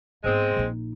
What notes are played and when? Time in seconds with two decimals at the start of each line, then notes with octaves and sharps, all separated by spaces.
0.24 G#2 G#3 B3 C4
0.56 A#1 D#4